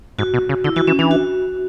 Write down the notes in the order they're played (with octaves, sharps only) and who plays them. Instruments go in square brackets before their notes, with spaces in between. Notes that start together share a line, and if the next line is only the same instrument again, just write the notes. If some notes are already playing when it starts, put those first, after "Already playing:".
[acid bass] G#2 [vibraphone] F#4
[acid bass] B2
C#3
[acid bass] D3 [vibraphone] E4
[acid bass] E3 [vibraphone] F#4
[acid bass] E3 [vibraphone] C#4
[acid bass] E3 [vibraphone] D4
[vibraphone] F#4